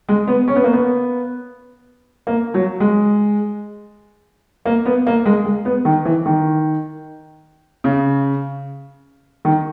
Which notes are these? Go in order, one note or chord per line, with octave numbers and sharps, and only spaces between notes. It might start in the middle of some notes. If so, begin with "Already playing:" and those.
G#3
B3
C#4
B3
A#3
B3
A#3
F#3
G#3
A#3
B3
A#3
G#3
G#3
B3
D#3
E3
D#3
C#3
D#3